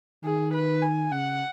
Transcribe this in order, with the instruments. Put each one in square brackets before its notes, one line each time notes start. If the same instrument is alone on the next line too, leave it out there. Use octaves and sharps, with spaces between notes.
[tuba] D#3 [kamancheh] G#4
[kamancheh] B4
G#5
[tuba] C#3 [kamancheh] F#5